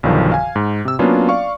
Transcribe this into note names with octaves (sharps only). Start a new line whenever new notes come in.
B1 G2 D3 D#3 F3
F5 G#5
G#2
C3 E6
F#3 A#3 B3 C#4 D4 F4
D5 F5 C#6